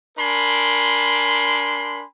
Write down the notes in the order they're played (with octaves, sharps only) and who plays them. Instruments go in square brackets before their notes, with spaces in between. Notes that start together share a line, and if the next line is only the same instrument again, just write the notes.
[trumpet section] D4 A#4 G#5 B5 C6